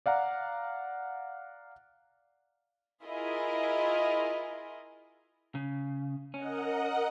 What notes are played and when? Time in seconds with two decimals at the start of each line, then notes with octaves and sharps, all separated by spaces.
0.06 D5 F5 F#5 A#5
3.04 E4 F4 G#4 A#4 D#5
5.55 C#3
6.34 C#4 A#4 D#5 F#5